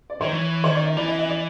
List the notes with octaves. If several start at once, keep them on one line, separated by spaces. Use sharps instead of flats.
D5
D#3 C#5
E3
D#3 C#5
D5
D#5
E3 D5
D#5
D#5
D5